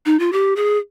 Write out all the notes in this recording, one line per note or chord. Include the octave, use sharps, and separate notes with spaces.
D#4
F4
G4
G#4